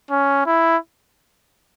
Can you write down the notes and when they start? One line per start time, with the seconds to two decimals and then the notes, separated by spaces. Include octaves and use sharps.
0.10 C#4
0.46 E4